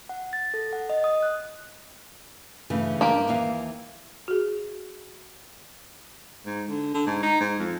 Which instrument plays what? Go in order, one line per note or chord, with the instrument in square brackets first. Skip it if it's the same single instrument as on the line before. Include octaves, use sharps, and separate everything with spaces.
[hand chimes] F#5
A6
A4
F#5
D#5
D#6
F#6
[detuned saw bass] G2 [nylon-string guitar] C#3 E3 A3
[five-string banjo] A#3 G4
[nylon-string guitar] D#2 E3 F5
[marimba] F#4 G#4
[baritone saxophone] G#2
D3
D3
G#2
D#4
G#2
F2